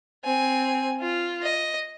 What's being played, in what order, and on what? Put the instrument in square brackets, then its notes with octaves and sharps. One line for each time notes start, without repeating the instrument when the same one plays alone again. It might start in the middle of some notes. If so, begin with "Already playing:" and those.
[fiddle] C4 G#5
F4
D#5